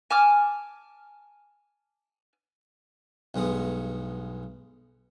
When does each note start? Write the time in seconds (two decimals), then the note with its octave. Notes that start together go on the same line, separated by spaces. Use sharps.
0.10 G#5 A5 D6 F6
3.34 B1 G2 G#3 B3